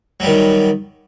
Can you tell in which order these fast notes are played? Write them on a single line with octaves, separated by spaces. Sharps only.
F#3 G3 D#3